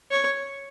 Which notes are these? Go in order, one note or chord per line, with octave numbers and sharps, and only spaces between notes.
C#5